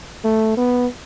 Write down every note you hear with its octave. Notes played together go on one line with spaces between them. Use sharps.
A3
B3